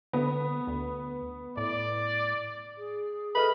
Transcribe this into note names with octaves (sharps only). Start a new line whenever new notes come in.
D3 B3
D2
A2 D5
G#4
A4 B4 D#5 B5 F6